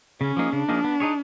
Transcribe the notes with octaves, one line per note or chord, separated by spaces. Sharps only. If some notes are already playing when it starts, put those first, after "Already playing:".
C#3 C#4
F3 A#3 D#4 G#4
C#3 D4
F3 A#3 D#4 G#4
B3
D#4 G#4 C#5